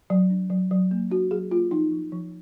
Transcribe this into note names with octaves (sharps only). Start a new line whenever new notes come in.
F#3
D4
F#3
F#3
A#3
D4 F#4
F#3 G#4
A#3 F4
F3 D#4
F3
F3